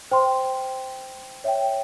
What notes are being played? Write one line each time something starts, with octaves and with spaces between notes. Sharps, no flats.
C5 G5 C6
C#5 E5 G5